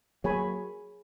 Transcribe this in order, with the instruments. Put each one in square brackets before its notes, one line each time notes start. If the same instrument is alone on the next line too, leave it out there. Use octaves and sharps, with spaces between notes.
[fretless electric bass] F#3 A#3 [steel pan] G#4 C#5 G#5 B5